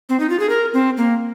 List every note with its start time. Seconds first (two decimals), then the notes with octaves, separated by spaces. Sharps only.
0.09 C4
0.20 D#4
0.30 F4
0.39 G#4
0.49 A#4
0.73 C4
0.97 A#3